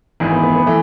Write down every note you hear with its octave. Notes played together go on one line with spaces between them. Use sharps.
G#1 G#2 E3
B3
B3
B3
E3 A3